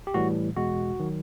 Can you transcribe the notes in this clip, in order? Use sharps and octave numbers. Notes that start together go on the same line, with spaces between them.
G4
A2 E3 G3 F#4
E2 B2 G#3 F#4
D#3 F#3